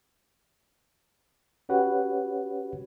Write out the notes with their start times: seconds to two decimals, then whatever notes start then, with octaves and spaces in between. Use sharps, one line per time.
1.69 C#4 F#4 G4 B4 C#5 F#5